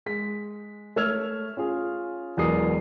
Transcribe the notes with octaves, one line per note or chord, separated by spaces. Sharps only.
G#3 B6
A3 C#5 E6 F6 G#6 F7
C#4 F4 G#4
E1 E2 F#3 A#4 D#6 C7